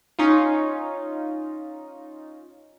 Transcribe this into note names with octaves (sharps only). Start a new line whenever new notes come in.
C#4 D#4 F4